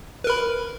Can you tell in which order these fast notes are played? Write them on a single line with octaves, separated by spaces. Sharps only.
B4 A#4 B5